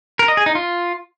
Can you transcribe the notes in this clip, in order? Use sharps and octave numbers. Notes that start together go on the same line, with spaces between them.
A#4
D#5
G#4
D#4
F4